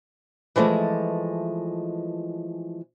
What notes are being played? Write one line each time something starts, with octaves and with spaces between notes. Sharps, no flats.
E3 F3 G#3 A3